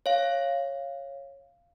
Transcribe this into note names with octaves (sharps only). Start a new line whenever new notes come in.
C#5 F5